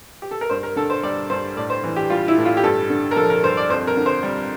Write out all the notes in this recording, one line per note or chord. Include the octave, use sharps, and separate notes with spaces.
G4
A4
A#4
G2 C5
A#4
D3 A4
C5
G3 D5
G2 C5
A2 D5
C5
E3
G4
G3 F4
E4
A2
F4
G4
G2 A4
D3
A#4
F3 A4
A#4
G2 C5
D5
F2 C5
A#4
D3
C5
G3